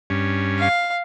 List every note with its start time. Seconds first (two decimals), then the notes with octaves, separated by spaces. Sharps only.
0.10 G2 C#4
0.59 F5